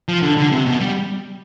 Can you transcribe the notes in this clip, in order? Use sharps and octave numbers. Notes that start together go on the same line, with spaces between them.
F3
D3
D3
C3
B2
G3